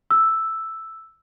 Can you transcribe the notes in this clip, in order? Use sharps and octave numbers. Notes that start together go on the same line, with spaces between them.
E6